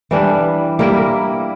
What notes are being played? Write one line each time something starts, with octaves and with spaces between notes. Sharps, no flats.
E3 G3 D4
G3 A#3 E4 A#4